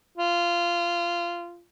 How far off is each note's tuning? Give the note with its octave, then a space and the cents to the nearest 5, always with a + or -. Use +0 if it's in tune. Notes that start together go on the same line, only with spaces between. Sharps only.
F4 -15